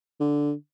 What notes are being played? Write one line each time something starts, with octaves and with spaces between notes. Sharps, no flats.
D3